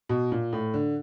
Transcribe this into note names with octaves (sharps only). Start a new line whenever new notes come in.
B2
A#2
A2
D3